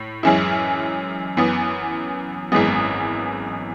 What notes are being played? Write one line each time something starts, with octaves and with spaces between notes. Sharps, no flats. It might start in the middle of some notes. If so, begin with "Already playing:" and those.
Already playing: A2
F#2 E3 G#3 C#4 E4
F#2 E3 B3
G#1 F#2 E3 G#3 B3